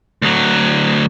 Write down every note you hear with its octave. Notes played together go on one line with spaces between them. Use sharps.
D2 F#3